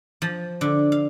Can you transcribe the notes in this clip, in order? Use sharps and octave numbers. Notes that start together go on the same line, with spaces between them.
F3
D3
F5